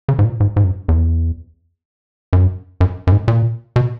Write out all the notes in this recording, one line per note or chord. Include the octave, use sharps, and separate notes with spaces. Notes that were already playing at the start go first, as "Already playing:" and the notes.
C#3
G#2
A#2
G#2
G#2
F#2
E2
F#2
F#2
F#2
G#2
A#2
B2